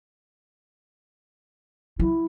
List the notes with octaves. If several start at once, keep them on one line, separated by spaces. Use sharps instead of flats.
F#3 E4